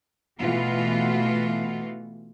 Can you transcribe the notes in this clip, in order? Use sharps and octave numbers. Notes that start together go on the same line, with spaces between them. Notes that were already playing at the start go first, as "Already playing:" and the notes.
B2 E3 A3 B3 F4 F#4